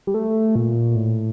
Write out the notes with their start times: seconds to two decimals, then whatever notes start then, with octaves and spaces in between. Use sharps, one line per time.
0.07 G3
0.14 A3
0.56 A#2
0.96 A2